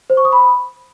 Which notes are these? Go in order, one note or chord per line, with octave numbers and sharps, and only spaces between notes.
C5
C#6
D#6
B5